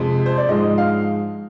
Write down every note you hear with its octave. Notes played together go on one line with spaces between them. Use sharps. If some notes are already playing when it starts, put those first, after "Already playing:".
Already playing: F2 C3 F3 G#3
C5
D5
G#2 F3 G#3 D#5
F5